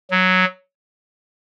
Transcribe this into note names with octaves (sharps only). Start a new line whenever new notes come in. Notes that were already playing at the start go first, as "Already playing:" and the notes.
F#3